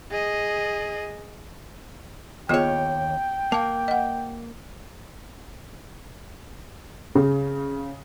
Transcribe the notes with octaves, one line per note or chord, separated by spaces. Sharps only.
G#4 D#5
D#2 B3 F4 G#4 C#5 G5
A#3 F5 A5
D#5 F#5
C#3